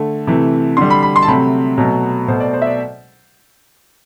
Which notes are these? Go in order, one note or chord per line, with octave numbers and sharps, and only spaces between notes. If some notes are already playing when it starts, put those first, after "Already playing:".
Already playing: D3 A3
C3 E3 A3
D3 G3 C6
B5
B5
C6
A5
C3 F#3 A3 B5
B2 F#3 A3
B2 A3 C5
D5
C5
E5
D5